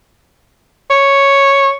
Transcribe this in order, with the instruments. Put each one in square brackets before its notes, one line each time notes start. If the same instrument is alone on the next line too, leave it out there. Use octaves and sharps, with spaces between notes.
[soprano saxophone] C#5